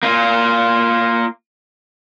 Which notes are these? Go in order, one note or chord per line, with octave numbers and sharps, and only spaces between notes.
A#3 F4